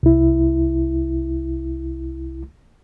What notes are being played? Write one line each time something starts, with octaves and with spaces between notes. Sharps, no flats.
C2 E4